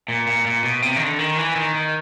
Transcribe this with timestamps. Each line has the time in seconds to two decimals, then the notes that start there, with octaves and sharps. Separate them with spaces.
0.08 A#2
0.27 A#2
0.45 A#2
0.64 B2
0.82 C3
0.96 D#3
1.01 D3
1.19 D#3
1.38 E3
1.56 D#3
1.74 D#3